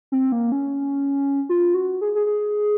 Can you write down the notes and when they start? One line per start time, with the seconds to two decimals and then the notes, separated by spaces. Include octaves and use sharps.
0.12 C4
0.32 A#3
0.52 C#4
1.49 F4
1.74 F#4
2.01 G#4
2.15 G#4
2.26 G#4